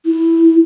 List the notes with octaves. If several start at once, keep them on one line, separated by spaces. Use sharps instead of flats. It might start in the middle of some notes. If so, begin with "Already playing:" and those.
E4